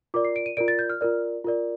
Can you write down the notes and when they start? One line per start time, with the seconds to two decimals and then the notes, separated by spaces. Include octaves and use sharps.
0.14 F4 A#4 D5 D6
0.25 C7
0.36 D7
0.46 D#7
0.57 F4 A#4 D5 D7
0.68 A6
0.79 G6
0.90 F6
1.01 F4 A#4 D5
1.44 F4 A#4 D5